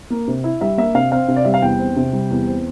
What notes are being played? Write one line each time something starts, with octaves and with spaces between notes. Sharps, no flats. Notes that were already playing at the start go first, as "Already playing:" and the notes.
A#3
C3
E4
G3 E5
A#3 E5
C3 F5
C4 F5
C3
D5
G3 E5
F5
E2 G5
C4
C3
G3
E2
C4